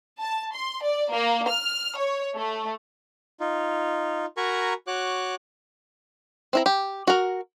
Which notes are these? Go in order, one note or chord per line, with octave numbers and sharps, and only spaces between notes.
A5
C6
D5
A#3
F6
C#5
A3
D#4 F4
F#4 A#4 G#5 A#5 B5 C#6
F#4 C#5 D6 F#6
C4 E4 A#5
G4
F#4 A#4